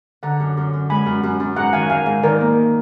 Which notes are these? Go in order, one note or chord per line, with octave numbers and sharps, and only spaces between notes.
D3 F#5 A#5
F#2
F#2
F#2
G#3 G#5 B5
F#2
F#2
F#2
G#2 F#5 A#5
D#3 F5 G#5
G#2 F5 G#5
G#2
D#3 A#4 D5
A#3